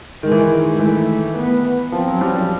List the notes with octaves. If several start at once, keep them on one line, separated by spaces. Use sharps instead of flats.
D#3 G#3
E3
D#3
E3 A3
B3
F3 C4
F#3
G3 C#4
F3